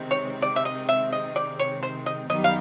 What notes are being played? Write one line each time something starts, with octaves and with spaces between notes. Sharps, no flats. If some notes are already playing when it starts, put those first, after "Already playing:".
Already playing: C3 D#3 G#3 C4
C#5
D5
E5
D#5
E5
D#5
D5
C#5
C5
D#5
F#2 D#3 G3 B3 D#4 D#5
F5